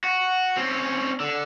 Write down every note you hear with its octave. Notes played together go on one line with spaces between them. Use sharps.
F#4
C4 C#4
D3